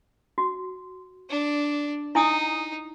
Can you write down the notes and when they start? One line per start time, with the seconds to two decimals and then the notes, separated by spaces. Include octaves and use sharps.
0.38 F#4
1.29 D4
2.15 D#4 E4 G#5 D#6